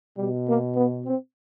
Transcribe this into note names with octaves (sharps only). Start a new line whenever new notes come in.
B2 G3
A#3
B3
C4